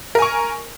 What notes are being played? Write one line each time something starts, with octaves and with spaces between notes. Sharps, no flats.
A#4 G#5 C#6